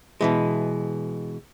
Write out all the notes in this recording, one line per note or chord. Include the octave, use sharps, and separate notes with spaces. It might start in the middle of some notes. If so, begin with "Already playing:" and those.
B2 E3 G#3